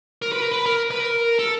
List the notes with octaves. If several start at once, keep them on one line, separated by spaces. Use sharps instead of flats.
A#4
B4
A#4
B4
A#4
B4
A#4
A4